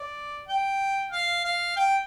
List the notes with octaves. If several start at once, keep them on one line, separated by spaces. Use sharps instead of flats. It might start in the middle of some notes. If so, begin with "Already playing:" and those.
Already playing: D5
G5
F5
F5
G5